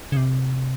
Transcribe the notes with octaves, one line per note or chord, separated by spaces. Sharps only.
C#3
C3